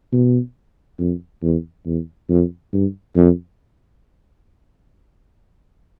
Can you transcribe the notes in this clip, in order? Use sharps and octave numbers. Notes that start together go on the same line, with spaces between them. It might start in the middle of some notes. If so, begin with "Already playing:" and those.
B2
F2
E2
E2
F2
G2
F2